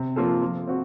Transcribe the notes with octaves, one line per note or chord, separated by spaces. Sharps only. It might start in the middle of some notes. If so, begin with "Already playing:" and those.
Already playing: C3
F3 A#3 F4 A4
F3
C4 F#4